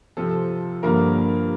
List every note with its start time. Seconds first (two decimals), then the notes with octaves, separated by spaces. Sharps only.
0.17 C3 F3 C4 A4
0.83 G2 D3 F3 A#3 A#4